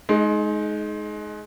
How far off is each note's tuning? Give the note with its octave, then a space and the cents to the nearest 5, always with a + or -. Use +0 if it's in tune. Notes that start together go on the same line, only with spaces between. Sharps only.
G#3 +30 D#4 +0